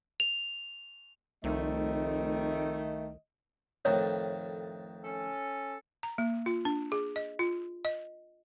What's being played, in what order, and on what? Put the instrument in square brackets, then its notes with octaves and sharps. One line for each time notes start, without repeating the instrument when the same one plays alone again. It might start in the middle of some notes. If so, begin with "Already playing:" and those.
[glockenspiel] F7
[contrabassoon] F1 [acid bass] C2 [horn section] D#3 A3 [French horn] D#5
[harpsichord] F2 A2 D#3 [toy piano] C#5
[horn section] C#4 A4
[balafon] A#5
A#3
F4
D4
G#4
D#5
F4
D#5